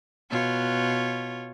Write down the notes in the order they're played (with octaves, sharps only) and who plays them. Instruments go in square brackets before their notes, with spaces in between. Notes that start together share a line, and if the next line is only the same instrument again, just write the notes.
[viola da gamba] B2 F4 C#5